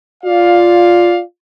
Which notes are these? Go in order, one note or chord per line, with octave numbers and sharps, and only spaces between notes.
F4 D5 F5